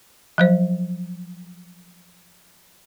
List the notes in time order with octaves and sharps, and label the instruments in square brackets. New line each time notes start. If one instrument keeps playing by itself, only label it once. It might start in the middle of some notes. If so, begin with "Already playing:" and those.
[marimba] F3 F#3 C5